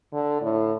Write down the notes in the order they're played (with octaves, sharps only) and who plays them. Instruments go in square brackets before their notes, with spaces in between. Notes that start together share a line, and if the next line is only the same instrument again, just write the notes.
[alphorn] D3
A2